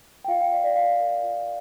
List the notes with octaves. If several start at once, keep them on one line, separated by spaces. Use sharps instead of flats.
G5
F4 F5
G5
D5 F5
D5
F4 F5
A#4
F4